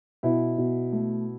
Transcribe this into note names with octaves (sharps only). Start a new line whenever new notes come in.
B2 E4
B2
A3